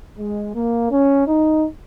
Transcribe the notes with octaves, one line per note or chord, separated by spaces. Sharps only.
G#3
A#3
C#4
D#4